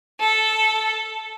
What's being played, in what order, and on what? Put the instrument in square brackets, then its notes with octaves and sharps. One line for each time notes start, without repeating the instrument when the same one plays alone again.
[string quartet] A4